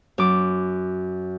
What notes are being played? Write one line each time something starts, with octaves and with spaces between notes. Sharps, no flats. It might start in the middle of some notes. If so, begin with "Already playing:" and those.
F#2 D6